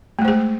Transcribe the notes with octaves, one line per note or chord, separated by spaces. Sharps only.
G#3 A3 G#4 C5